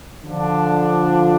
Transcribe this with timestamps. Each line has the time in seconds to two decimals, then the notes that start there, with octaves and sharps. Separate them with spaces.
0.23 D3 F3 D4